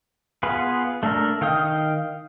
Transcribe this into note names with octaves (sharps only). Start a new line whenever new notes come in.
B3 F4 G#4 B4
A3 D4 A4 A#4
D#3 F5 G5 D#6